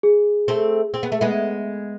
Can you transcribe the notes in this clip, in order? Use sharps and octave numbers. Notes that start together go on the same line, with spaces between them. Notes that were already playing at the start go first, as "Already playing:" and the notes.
G#4
A3 C4
C4
B3
A3
G#3 B3